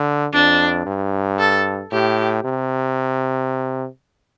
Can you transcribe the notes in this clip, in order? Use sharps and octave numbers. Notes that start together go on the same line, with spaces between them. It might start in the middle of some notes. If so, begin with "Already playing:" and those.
Already playing: D3
F2 D4
G2
A4
A2 G4
C3